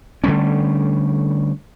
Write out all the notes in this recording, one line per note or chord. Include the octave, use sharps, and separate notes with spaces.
D3 G3 A3 C#4